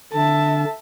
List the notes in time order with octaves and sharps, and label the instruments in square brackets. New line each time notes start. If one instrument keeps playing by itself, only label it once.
[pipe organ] D3 D4 [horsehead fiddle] E5 A5